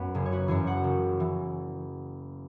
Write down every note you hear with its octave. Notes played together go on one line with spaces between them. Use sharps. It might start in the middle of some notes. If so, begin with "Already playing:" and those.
Already playing: F#2 B3 F#4 B4
F#1 G#4
C#5
F#4 B4
F#2 E3 G#4 C#5
C#5 F#5
F#1
E3